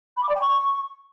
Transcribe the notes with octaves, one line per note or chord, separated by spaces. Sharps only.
B5
D6
D5
G5
C#6